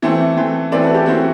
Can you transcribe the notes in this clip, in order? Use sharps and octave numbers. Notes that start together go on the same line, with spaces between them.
E3 A3 C4
E3 A3 C4
E3 A3 C4 B4 D5
F#4 A4
G4
E3 A3 C4 F#4